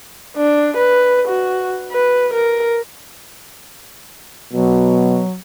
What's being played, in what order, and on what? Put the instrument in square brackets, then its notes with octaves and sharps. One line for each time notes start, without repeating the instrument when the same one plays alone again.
[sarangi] D4
B4
F#4
B4
A#4
[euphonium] B2 [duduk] F#3